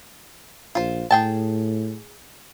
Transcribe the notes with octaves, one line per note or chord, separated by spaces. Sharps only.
A#1 F4 C5
A2 G#4 G5 A5